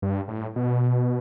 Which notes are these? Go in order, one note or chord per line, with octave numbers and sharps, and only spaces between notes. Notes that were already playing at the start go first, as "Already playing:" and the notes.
G2
A2
B2